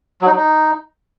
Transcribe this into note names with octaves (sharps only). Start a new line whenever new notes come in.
F#3
D#4
F#3
D#4